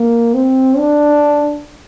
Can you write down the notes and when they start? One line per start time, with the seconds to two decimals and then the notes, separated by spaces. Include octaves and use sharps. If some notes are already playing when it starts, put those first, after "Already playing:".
Already playing: A#3
0.34 C4
0.77 D4